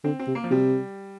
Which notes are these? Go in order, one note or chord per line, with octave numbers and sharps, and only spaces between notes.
D3 C4
C4
C3
A#3
F3
C3 G3